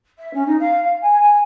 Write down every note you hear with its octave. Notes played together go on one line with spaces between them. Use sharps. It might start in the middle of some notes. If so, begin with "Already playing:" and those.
E5
C#4
D#4
F5
F5
G#5
G#5